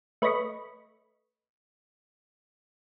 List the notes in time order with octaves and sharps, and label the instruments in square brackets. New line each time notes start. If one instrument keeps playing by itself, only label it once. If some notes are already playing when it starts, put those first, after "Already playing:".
[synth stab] A3 B4 C#5 D#5 B5 C#6